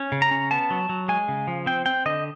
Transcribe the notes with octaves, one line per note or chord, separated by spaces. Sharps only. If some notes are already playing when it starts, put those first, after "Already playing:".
Already playing: C#4
C#3
A#5
C#4
B3 A5
F#3
F#3
G#3 G#5
C#3
F3
C4 G5
C4 G5
D3 D#5